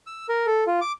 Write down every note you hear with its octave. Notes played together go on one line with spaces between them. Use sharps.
E6
A#4
A4
F4
D6